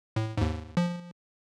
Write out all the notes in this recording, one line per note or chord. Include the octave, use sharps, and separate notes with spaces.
A2
D#2 G#2
F3